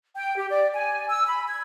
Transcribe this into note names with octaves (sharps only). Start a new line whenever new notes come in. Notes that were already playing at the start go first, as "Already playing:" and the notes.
G5
G4
D5
G#5
E6
B5
G#6